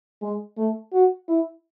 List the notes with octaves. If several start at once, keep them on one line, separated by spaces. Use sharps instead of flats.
G#3
A3
F#4
E4